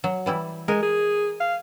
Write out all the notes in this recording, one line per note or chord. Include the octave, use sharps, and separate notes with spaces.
F#3
E3 G3 E4
G#3 A#4 G#5
G#4
F5